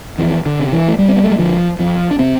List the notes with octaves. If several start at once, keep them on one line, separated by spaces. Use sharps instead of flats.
F2 E3
D3
C3
E3
A3
G2 G3
C4
B3
A3
G3
D3 F3
F2 F3
D4
C3 C4